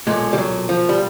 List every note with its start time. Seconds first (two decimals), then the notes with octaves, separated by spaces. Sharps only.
0.07 B1 A#2 G#3
0.33 G3
0.38 F#3
0.69 F3
0.89 G3